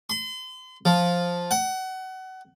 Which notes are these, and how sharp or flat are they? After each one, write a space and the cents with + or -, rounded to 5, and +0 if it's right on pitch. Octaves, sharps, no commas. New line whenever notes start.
C6 -40
F3 +5
F#5 +25